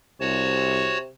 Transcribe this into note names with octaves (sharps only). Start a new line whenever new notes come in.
C2 C3 F#4 C#5 A5